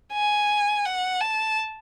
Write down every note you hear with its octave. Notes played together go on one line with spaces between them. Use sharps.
G#5
F#5
A5